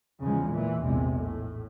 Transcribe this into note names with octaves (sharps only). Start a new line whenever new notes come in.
E2 C#3 F3 G#3
A#2 E3
A#1 E2 C3 G#3
A2